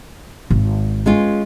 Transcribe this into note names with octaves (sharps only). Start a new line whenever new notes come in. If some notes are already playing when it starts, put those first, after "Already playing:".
G#1
G#3 C#4 F4